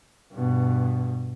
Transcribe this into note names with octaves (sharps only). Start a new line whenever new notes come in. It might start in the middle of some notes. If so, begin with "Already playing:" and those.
G2 B2